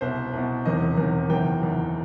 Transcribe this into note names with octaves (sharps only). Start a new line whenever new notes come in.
C2 B2 C5
C2 B2
E1 E2 C3 D#3 D#5
E1 E2 C3 D#3
F#1 E2 D#3 G5
F#1 E2 D#3